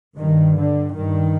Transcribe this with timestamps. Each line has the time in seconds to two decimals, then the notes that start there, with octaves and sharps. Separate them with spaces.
0.17 G2 D#3
0.56 D3
0.95 G2 D#3